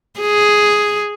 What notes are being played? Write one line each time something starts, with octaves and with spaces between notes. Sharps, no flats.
G#4